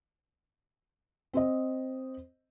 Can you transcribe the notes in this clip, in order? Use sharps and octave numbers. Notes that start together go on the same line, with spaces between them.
C4 C5 D#5